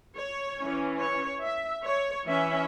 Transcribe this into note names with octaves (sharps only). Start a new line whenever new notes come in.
C#5
C#4
E3
C#5
E5
C#5
E3 C#4 E5